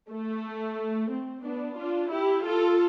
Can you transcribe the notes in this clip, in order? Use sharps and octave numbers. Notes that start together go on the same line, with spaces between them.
A3
C4
B3 D4
D4 F4
E4 G4
F4 A4